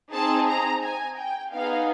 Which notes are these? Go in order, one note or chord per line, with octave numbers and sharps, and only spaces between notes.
C4 D#4 G#4 A5
A#5
G#5
G5
B3 D#4 G#4 F5